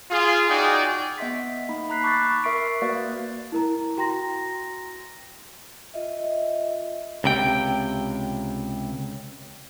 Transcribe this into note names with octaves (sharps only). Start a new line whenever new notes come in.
F4 G#4
D#4 F#4 G#4 D5 G5 G#5
B3 D#5 E5 C6 B6
A#3 D#4 B5
A#5 B5 F#6 B6 C7
A5 C#6 D6 F#6 G6 A6
A#4 E5 C6 C#6 C7 D7
A#3 F#4 B4 D5 F5
E4 A#4 A#5
F#4 G5 A#5 C6 A#6
F4 D#5 E5
C#2 C3 G5